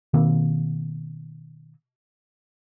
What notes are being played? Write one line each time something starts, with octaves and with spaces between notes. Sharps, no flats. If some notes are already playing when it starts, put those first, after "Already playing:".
B2 D#3 A#3 C4